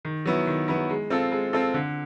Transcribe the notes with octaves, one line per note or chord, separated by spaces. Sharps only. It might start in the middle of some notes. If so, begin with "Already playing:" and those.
D#3
F#3 B3 E4
D#3
F#3 B3 E4
G#3
C4 F4 A4
G#3
C4 F4 A4
D3